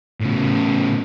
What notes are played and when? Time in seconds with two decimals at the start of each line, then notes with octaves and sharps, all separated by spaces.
0.20 A2 C#3